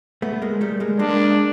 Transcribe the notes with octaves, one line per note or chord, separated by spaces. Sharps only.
A3 B3
G#3 A#3
G3 A3
G#3 A#3
G#3 A#3 D4